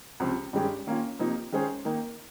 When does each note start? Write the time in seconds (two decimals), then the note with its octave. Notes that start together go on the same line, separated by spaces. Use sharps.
0.20 C#2 C3 F3
0.53 G2 D#3 G#3 C#4 G4
0.87 D#3 A#3 C#4 F4
1.19 C3 F3 A#3 D#4
1.52 D#3 G#3 C#4 G#4 C5
1.85 D#3 A#3 D#4 A#4